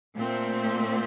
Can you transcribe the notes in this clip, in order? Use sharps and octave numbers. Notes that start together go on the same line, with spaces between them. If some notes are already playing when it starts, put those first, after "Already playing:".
A#2 A3 C4